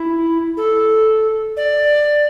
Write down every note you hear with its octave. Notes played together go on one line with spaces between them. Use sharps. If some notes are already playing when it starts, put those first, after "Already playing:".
Already playing: E4
A4
D5